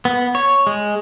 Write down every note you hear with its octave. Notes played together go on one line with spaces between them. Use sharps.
B3
C#5
G#3